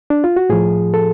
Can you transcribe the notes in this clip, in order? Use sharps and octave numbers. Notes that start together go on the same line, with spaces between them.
D4
F4
F#4
A2 F3 G#4
A4